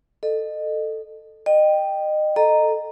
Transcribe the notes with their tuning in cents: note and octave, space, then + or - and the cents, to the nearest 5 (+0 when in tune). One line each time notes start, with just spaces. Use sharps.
A4 +5 D#5 -25
D#5 -25 G5 +0
A4 +0 D#5 -15 A#5 +0